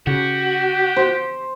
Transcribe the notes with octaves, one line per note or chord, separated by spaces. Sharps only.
C#3 F#4 G4
C5